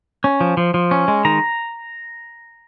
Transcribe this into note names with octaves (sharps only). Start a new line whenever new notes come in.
C#4
F3
F3
F3
C#4
G#3
D#3 A#5